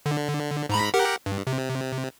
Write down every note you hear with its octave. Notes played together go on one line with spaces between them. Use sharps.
D3
G#2 A#5 B5
G4 A#4 F#5
G2
C3